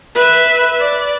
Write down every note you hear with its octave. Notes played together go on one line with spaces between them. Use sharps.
B4 E5
D5